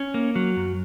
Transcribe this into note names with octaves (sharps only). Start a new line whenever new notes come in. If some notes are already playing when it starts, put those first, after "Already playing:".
Already playing: C#4
A#3
F#3
F#2